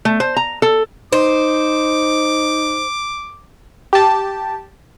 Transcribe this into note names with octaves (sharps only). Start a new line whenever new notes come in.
A3
C5
A#5
A4
D#4 C5 D6
G4 A5